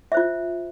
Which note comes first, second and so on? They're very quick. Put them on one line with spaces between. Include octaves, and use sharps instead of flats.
E5 C5 F4